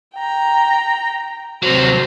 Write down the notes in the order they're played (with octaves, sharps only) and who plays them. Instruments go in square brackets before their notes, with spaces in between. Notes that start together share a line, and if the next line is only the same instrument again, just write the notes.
[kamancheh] G5 A#5
[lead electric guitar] C3 F#3 [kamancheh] C5